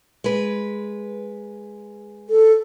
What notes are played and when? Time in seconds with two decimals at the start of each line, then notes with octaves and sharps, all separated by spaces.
0.24 G#3 B4
2.29 A4